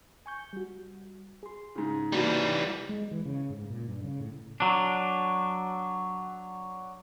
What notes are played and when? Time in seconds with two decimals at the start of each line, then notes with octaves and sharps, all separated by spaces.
0.26 G#5 C#6 G6
0.53 G3 F#4
1.43 G#4 C6
1.75 G#2 C#3
2.12 E3 G3 A#3 F#4 A5
2.89 G#3
3.11 E3
3.25 C#3
3.50 G#2
3.70 A#2
3.88 G2
4.04 C#3
4.20 A2
4.60 F#3 D4